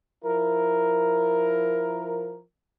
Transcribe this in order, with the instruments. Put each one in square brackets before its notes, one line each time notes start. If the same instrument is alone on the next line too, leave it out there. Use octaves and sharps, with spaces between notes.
[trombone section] F3 E4 A#4